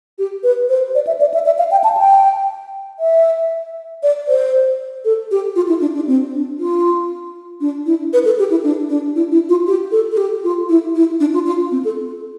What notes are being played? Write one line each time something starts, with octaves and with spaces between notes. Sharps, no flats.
G4
B4
C5
D5
E5
D5
E5
E5
F5
G5
A5
G5
E5
D5
C5
A4
G4
F4
E4
D4
D4
C4
D4
F4
D4
E4
B4
A4
G4
E4
D4
D4
E4
E4
F4
G4
A4
A4
G4
F4
E4
E4
D4
F4
F4
C4
A4